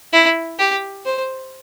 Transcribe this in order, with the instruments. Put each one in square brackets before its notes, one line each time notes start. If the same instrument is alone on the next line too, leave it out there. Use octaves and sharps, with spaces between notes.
[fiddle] E4
G4
C5